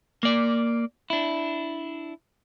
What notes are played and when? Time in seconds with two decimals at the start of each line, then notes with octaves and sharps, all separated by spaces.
0.23 A#3 D5
1.10 D4 E4